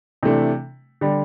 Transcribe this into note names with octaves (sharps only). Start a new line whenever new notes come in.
C3 E3 A3 D4
D3 G3